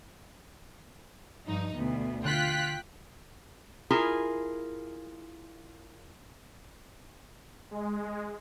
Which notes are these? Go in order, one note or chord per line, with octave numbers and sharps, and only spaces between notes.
G2 F3 D#4
D2 B2 B3
D3 F4 G5 F#6 B6
E4 F4 G#4 A#4
G#3